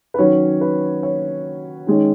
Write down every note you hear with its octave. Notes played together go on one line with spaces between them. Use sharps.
B4
D#3 F#3 C#4 C#5
B4
C#5
D#3 G#3 C#4